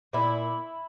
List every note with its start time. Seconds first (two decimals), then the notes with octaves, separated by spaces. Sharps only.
0.13 A#2 E4